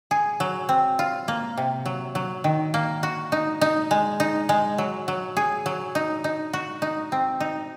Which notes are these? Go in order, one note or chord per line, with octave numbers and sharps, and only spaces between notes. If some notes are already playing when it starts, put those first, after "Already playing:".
G#4
F#3
C4
F4
A#3
C3
F#3
F#3
D#3
A#3
F#4
D#4
D#4
G#3
D#4
G#3
F#3
F#3
G#4
F#3
D#4
D#4
F#4
D#4
C4
D#4